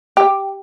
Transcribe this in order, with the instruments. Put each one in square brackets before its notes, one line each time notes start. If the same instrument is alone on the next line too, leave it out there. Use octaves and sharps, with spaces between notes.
[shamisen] G4